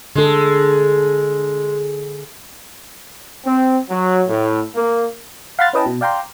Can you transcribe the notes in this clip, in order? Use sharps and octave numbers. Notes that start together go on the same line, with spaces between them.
D3 G#3 A4
C4
F#3
A2
A#3
F5 F#5 B5 C6 F6 A6
C#4 E4 B4 D#5 G5 A5
B2
D5 F5 G5 A#5 C6